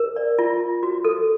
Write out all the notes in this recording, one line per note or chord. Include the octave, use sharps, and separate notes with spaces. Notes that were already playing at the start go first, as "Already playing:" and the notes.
Already playing: A#4
D5
F4
F4
F#4
A4